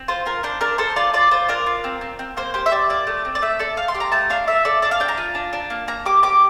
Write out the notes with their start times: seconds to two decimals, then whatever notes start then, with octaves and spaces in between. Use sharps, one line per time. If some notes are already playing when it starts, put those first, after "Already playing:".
Already playing: C4
0.08 F4 C5
0.25 F4 A#4
0.43 D4 C5
0.61 D4 A#4
0.78 A4 C5
0.96 F4 D5
1.14 F4 D5
1.31 F4 C5
1.49 D4 A#4
1.66 F4
1.84 C4
2.01 C4
2.19 C4
2.37 A#3 C5
2.54 G4 C5
2.66 E5
2.71 G4 D5
2.89 A#3 D5
3.07 A3
3.25 C4
3.35 D5
3.42 A3 E5
3.59 A4 D5
3.77 A3 F5
3.88 C6
3.95 G4
4.00 A#5
4.12 A3 A5
4.30 D4 F5
4.47 A4 E5
4.65 A4 D5
4.82 D4 D5
4.91 F5
5.00 D4 G5
5.08 A#5
5.18 F4
5.35 D4
5.53 D4
5.70 A#3
5.88 A#3 A#5
6.06 G4 D6
6.23 G4 D6